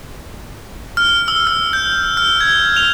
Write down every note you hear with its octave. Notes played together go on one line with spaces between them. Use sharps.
F6
E6
F6
G6
F6
G#6
F7